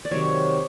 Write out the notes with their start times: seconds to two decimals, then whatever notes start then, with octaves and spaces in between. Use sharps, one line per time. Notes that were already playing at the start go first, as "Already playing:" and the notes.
0.05 D5
0.11 C3 D#3 F#3 C#5